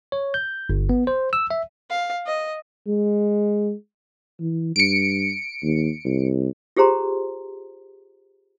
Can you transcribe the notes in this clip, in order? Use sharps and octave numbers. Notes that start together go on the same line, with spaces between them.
C#5
G6
G1
B3
C5
E6
E5
F5
D#5
G#3
E3
G2 C#7 D7
D#2
C2
F4 G4 G#4 C5 A#5 C6